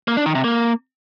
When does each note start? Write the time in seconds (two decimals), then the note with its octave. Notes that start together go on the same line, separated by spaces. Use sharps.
0.08 A#3
0.17 D4
0.26 D#3
0.35 C3
0.44 A#3